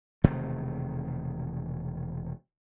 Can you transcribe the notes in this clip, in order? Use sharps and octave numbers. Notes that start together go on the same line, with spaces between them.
E1 C3 D#3 A3